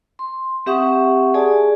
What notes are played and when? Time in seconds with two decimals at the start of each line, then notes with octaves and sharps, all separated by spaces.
0.19 C6
0.66 C4 G4 E5 F#5 C#6 D#6
1.34 G#4 D5 G#5 A5